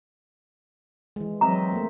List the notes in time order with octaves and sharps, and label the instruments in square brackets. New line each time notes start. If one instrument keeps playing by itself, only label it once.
[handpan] E3 G#3
[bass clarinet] F#3 [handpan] C4 D#5 E5 [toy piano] A#5
[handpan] A3 A#3